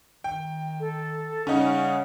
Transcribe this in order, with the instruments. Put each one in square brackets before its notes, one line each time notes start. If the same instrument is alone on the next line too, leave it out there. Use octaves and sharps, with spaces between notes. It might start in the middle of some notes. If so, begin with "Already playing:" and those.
[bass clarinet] D#3 [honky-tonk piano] G5
[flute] A4
[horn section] C#3 [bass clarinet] G3 [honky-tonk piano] C#4 D#4 [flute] F#5